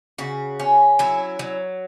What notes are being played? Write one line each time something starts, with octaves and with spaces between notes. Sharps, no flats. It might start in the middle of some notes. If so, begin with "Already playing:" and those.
C#3 F#4
C#4
F#3 E4
F#3